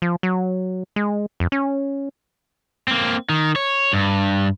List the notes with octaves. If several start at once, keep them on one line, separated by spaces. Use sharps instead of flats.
F3
F#3
G#3
F2
C#4
A#3 C4
D#3
C#5
G2